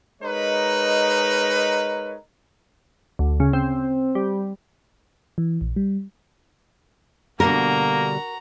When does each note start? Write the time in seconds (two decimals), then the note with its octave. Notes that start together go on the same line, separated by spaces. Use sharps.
0.22 G#3 D#4 A#4 B4 C#5
3.19 D2
3.40 C#3
3.53 C4
4.15 G3
5.38 E3
5.61 A#1
5.76 G3
7.40 B2 D3 G3 A#3 F#4 A#4 A#5